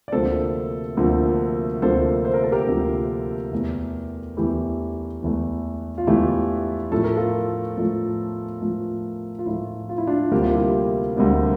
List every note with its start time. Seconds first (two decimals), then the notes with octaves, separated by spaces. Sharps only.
0.08 D5
0.12 D2 C3 F3 A#3 A4 C5
0.97 D2 C3 F3 A#3
1.82 D2 C3 F3 A#3 A4 C5
2.25 C5
2.34 A#4
2.43 A4
2.52 G4 A#4
2.67 D2 C3 F3 A#3
3.52 E2 E3 A3
4.37 E2 E3 A3 E4 G4
5.22 E2 E3 A3
5.98 F4
6.07 E2 E3 A3 E4 G4
6.92 A2 F3 A3 A4
7.04 A#4
7.16 F4 A4
7.77 A2 F3 A3
8.61 A2 F3 A3
9.39 F4
9.46 A2 F3 A3 E4
9.89 F4
9.98 E4
10.07 D4 F4
10.31 D2 C3 G3 A#3 G4
10.43 F4
10.54 E4 G4
11.17 D2 C3 G3 A#3